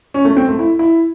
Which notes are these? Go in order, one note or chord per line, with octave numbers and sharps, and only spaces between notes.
C#4
A3
C4
A3
E4
E4